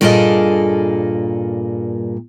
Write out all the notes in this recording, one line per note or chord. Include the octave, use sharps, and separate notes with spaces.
G2 A#2 A#3 G#4 A4 D#5